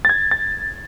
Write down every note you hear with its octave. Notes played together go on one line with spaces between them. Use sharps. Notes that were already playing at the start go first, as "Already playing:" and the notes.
A6
G#6
A6